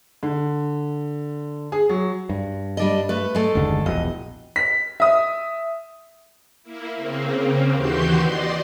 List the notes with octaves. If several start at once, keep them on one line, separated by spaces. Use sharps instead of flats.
D3
G#4
F#3
G2
G3 D4 D#5
A3 B4
G#3 A3 A4
F#1 D#2 D3
E1 A#1 D#5
B6
E5 D#6
A#3 E4
C#3 A#3 C4
D#2 E3 F#4 G4 C6 G6
D5 D#5 C6